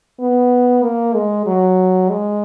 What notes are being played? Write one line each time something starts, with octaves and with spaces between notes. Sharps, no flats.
B3
A#3
G#3
F#3
G#3